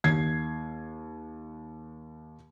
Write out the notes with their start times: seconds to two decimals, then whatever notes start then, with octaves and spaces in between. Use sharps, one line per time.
0.04 D#2 G#6 C7